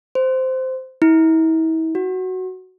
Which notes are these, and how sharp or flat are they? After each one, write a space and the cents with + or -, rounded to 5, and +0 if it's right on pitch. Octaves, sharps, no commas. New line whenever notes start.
C5 -10
E4 -40
F#4 +5